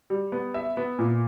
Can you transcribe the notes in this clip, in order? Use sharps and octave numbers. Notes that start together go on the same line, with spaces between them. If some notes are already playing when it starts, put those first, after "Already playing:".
G3
B3
E5
B3
A#2